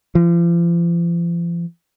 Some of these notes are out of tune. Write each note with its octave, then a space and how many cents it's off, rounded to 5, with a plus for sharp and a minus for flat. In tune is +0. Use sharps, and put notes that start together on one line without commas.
F3 -40